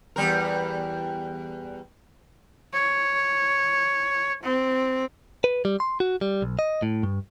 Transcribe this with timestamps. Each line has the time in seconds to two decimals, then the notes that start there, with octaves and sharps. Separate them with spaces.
0.16 E2 G3 A#4
2.73 C#5
4.43 C4
5.44 B4
5.65 G3
5.80 C6
6.00 F#4
6.21 G3
6.42 B1
6.59 D#5
6.82 A2
7.03 G2